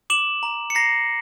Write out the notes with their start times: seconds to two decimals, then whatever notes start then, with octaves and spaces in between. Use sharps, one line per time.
0.10 D6 E7 F#7
0.43 A#5
0.70 C#7
0.75 A#5 A#6 C7